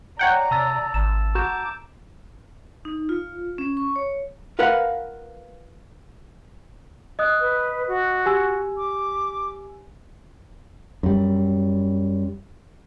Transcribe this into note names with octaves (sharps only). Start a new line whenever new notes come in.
C#5 D5 F#5 G5 A#5
C3 A5 E6 A6
G#1 E7
F#4 A#5 D6 G6 E7
D#4
F4
C#4
C#6
C#5
F4 A#4 B4 F5 F#5
D#5 D#6 F#6
B4
F#4
G4 G#5 E6
D6
F#2 G3